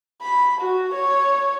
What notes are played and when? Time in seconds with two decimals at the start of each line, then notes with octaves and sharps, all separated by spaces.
0.22 B5
0.61 F#4
0.94 C#5